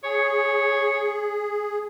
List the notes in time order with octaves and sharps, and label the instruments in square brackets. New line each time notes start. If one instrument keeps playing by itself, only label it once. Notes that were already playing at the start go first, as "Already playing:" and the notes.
[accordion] G#4 [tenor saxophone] C#5